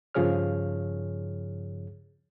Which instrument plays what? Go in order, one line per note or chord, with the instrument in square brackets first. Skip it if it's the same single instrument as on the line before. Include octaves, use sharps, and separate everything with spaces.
[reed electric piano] G2 C#3 F3 G#4 C#5 F6